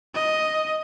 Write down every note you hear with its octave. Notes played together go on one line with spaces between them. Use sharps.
D#5